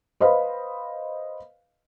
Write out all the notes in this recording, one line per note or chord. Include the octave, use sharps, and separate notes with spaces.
B4 C5 D#5 F5 B5